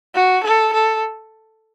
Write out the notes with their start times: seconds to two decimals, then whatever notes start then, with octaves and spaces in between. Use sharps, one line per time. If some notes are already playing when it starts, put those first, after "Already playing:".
0.15 F#4
0.44 A4
0.73 A4